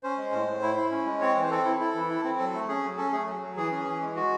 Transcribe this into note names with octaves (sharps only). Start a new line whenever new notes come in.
C#4 C5
G#3
A2
A2
E4
E4
C#4
G#3
C4 C#5
E3
C5
C4 A4
E4
E4 A4
E3
E4
C4
F#3 A4
A3
C#4 G#4
F#3
C#4 A4
A3 G#4
F#3
F#3
E3 G#4
C#4
E3
G#3
G#3 F#4